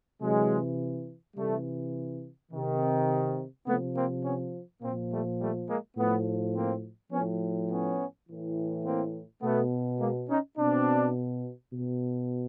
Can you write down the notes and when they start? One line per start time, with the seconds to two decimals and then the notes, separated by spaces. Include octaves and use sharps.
0.21 C3 E3 F#3 G#3
1.36 C3 E3 G3 A3
2.51 C3 D#3
3.66 C3 A3 B3
3.71 F3
3.95 A#3 C4
4.24 B3 C#4
4.81 A#2 F3 A#3 C4
5.10 G3 A3
5.39 G3 A3
5.67 G#3 A#3
5.97 A2 F3 A3 B3
6.54 A#3 C4
7.12 F3 B3 C#4
7.16 A2
7.69 B3 C#4
8.27 A2 E3
8.85 A#3 C4
9.42 B2 A3 B3
9.99 G#3 A#3
10.29 C#4 D#4
10.57 B2 C4 D4
11.73 B2